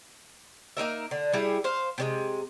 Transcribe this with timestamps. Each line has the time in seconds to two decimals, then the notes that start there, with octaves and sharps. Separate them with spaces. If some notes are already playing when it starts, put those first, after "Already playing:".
0.77 A#3 D#4 A#4 E5
1.11 D3
1.33 G3 E4 G4 G#4
1.64 C5 F5
1.98 C3 G3 G#3